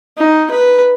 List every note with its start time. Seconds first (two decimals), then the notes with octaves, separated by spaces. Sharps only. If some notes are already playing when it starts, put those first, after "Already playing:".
0.18 D#4
0.51 B4